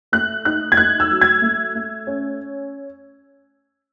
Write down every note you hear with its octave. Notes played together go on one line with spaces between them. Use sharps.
A3 F#6
D#4 F#6
G#6
A3 F#6
E6
F#3
G#6
A3
A3
C#4